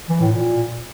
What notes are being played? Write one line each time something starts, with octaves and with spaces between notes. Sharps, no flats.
E3
A2
A#2